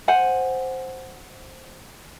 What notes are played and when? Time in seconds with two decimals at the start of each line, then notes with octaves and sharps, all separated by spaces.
0.08 C5 F#5 G#5